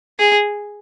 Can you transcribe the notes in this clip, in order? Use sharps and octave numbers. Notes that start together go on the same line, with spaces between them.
G#4